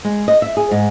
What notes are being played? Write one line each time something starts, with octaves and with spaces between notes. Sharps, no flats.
G#3
D#5
E5
G#4
G#2